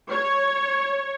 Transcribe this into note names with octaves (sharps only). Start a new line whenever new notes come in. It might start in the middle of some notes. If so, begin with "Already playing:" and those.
C#5